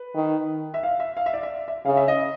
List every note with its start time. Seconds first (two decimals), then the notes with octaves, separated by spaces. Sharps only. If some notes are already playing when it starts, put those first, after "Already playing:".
Already playing: B4
0.15 D#3
0.74 E5
0.83 F5
1.00 E5
1.17 F5
1.26 E5
1.33 D5
1.43 E5
1.68 E5
1.85 C#3 F5
1.97 E5
2.08 D#5